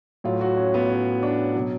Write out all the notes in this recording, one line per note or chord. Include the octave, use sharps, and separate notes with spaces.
A2 F#3 F4
F#4
C#4
B3
C#4
D4
B2 F#3